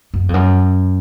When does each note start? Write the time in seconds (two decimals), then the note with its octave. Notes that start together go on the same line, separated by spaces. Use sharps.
0.14 F#2
0.29 F2
0.34 F#2